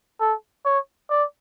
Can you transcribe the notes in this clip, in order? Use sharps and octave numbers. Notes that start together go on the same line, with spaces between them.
A4
C#5
D5